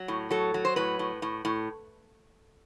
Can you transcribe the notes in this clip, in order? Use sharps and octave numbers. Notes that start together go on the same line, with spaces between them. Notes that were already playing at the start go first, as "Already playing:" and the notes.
Already playing: F#3
A2
F#3 A4
F#3
C5
A2 B4
A2
A2
A2